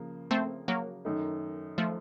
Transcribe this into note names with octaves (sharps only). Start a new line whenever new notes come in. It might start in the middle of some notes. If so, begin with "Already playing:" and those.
Already playing: C#3 F3 A#3
A3 C4
F#3 A#3
F#2 D#3 A3 D#4
F3 A3